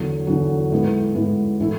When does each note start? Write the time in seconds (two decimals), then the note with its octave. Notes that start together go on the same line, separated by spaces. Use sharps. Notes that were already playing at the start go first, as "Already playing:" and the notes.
Already playing: E2 D3 F#3
0.27 E2 D3 F#3
0.72 A2 G#3 B3
1.15 A2 G#3 B3
1.59 A2 E3 A3 E4